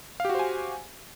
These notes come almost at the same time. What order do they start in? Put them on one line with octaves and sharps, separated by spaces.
F5 G4 F#4 C5 G#5